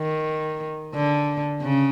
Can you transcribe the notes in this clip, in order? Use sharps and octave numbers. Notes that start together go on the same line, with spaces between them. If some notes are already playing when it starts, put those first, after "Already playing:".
Already playing: D#3
D3
C#3